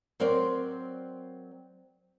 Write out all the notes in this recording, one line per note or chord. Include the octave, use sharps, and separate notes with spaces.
F#3 C4 A#4 C5 D5